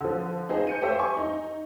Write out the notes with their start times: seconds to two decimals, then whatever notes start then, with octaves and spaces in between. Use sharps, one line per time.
0.01 D3 F3
0.49 D#4 F4 G#4 C5
0.67 G6 C#7 D#7
0.82 G4 A4 C5 C#5 E5 F5
0.99 G#5 C#6
1.17 D#4